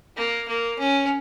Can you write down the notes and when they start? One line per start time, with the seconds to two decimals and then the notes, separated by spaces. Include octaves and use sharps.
0.16 A#3
0.48 A#3
0.79 C#4